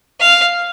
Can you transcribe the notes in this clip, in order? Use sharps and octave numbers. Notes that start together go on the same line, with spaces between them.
F5